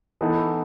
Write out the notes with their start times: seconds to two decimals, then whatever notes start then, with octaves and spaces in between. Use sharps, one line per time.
0.21 E3 B3 D#4 A4